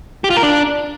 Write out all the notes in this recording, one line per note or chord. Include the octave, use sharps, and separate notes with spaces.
G4
F4
A#4
D4